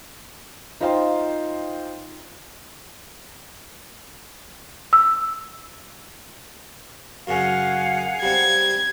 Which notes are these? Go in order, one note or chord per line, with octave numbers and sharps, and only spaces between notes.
D#4 F4 C5 F5 G5 C6
E6
F#2 C#3 C#4 G#4 F5 F#5
G3 C4 G#6